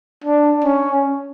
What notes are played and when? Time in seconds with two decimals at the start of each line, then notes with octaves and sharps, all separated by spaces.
0.24 D4
0.64 C#4